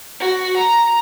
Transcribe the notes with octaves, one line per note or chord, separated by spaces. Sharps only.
F#4
A#5